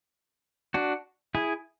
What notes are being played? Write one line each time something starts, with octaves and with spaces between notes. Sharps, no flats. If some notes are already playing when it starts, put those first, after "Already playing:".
D4 F#4
E4 G#4